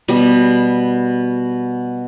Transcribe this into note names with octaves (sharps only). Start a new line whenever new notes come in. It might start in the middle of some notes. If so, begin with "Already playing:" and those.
B2 G3